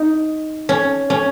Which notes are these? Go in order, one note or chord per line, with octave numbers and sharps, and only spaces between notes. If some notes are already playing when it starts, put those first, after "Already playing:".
Already playing: D#4
C#4
C#4